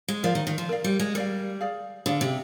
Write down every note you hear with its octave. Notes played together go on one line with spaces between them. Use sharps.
G#3
F3 A#4 D5 F5
D#3
D#3
F3
A#4 D5 F5
G3
G#3
G3 A#4 D5 F5
G#4 D5 F5
D3 G#4 D5 F5
C3